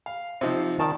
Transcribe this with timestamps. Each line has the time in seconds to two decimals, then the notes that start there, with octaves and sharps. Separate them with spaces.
0.06 F5
0.41 C3 F3 D#4 C5
0.79 D#3 A#4 D5 A5